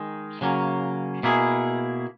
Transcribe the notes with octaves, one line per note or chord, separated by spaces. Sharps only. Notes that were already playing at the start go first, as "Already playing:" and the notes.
Already playing: D#3 G#3 D#4
C#3 F#3 A#3 C#4
B2 A#3 E4 G#4